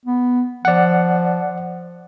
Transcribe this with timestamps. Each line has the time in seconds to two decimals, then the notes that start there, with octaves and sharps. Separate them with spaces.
0.06 B3
0.65 F3 D5 F#5